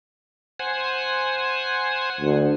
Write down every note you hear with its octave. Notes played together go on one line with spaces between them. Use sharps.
C5 F#5 G#5
D2